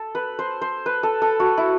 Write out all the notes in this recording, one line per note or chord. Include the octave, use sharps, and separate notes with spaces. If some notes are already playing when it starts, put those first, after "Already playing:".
Already playing: A4
B4
C5
C5
B4
A4
A4
F#4
E4